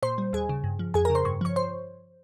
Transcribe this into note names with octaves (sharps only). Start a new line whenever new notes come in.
A#2 C5 C6
G3
D#2 G#4 G#5
C#3
G2
F3
F2 G#4 G#5
A#4 A#5
C#3
C5 C6
G2 C#6
F3 C#5 C#6
C5 C6